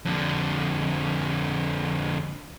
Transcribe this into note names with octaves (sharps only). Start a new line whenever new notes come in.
F2 D3